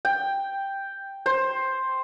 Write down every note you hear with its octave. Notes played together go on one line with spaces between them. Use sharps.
G5
C5